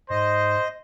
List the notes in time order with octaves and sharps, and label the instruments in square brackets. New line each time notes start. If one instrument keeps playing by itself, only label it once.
[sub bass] G#2 [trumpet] C5 [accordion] D#5